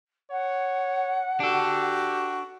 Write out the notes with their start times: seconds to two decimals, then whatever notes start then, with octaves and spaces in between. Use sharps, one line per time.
0.31 C#5 F#5
1.40 D4 F#4 G4 A4